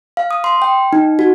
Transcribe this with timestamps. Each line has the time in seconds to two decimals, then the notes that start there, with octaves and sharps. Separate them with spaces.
0.17 F5
0.31 D#6
0.44 C6
0.62 G5
0.93 D#4
1.19 F#4